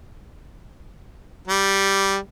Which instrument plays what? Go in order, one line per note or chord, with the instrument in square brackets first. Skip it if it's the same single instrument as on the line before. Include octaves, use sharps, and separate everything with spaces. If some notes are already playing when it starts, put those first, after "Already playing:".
[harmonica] G3